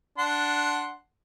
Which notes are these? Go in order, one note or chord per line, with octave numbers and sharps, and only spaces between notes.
D4 F#5 C6